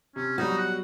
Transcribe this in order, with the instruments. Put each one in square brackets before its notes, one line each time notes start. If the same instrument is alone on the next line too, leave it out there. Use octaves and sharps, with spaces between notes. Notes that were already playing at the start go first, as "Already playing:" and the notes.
[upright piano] C3 [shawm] C#4
[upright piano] B2 F#3 G3 [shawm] D#4 [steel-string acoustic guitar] F#4
[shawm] F#5